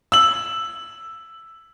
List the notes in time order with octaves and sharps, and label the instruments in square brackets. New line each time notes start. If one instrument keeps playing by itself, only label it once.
[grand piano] E6 F#7